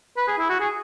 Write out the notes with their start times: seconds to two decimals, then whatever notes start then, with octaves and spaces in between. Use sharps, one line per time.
0.17 B4
0.28 G#4
0.39 E4
0.50 F#4
0.60 G#4